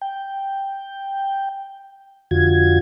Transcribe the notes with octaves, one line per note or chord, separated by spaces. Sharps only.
G5
F2 D3 F4 F#4 G#6